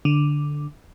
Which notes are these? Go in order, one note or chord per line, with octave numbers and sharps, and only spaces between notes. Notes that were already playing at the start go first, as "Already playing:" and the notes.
D3